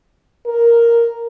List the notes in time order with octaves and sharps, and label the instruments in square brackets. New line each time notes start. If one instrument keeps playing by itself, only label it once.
[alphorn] A#4